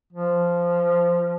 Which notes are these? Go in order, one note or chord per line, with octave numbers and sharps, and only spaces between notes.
F3